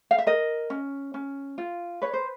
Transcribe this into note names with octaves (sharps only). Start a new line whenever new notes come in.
F5
E5
A#4 D#5
C#4
C#4
F4
B4 C#5
C5